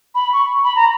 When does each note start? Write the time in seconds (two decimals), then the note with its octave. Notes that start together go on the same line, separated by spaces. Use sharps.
0.15 B5
0.33 C#6
0.64 B5
0.76 A#5